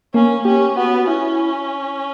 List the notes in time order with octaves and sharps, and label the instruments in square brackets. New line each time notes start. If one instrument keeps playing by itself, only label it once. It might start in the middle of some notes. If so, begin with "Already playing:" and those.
[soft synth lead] A#3 [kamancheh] C#4
[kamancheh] C#4 [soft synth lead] G4
[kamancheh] B3 [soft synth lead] F#4
[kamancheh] C#4 [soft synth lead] E4